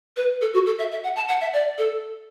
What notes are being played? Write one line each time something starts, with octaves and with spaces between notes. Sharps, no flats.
B4
A4
F#4
A4
E5
E5
F#5
A5
F#5
E5
D5
A4